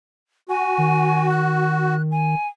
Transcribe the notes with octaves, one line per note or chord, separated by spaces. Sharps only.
F#4 G#5
D#3
F#6
G#5